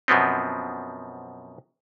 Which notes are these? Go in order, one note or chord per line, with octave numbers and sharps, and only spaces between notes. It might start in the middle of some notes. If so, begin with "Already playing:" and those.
F#2 B2 F3 B3 C4